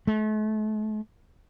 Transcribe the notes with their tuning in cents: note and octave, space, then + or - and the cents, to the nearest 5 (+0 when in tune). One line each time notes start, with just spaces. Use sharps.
A3 -40